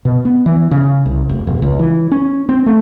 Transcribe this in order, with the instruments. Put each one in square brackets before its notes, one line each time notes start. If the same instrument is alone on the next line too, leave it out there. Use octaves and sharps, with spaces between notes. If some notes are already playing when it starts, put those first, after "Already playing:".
[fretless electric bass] B2
B3
E3
C#3
C2
F1
E1
C#2
E3
C#4
C4
A3